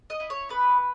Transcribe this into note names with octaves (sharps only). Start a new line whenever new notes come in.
D#5
E4
C#5
B3 B4